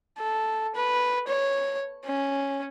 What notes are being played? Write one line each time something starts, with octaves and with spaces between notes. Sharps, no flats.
A4
B4
C#5
C#4